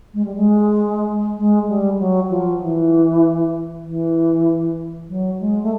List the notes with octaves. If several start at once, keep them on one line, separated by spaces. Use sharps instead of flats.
G#3
G3
G#3
G#3
G3
F#3
F3
E3
E3
F#3
G#3
A3